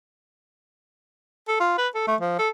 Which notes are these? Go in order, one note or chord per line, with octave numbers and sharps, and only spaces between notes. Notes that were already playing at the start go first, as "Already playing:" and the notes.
A4
F4
B4
A4
A3
F3
A4